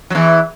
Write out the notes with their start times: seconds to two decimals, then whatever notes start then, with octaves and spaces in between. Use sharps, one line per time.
0.10 F#3
0.15 E2 E3